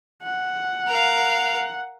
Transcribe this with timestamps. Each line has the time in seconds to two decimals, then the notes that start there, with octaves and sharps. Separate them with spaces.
0.23 F#5
0.88 A#4 F5